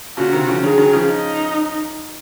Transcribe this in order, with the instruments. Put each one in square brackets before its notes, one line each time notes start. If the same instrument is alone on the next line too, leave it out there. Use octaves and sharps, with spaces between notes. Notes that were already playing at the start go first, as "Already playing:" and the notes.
[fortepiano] A#2 C#3 [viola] F#4
[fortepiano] C3 D#3
C#3 F3
[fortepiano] D#3 F#3 [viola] G#4
[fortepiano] D#3 F#3
C#3 F3
[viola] D#4